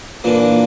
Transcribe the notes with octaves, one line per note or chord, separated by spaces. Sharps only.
A#2 E3 A#3 D4